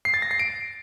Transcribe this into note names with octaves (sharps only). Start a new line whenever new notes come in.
C7
A6
A#6
C7
D7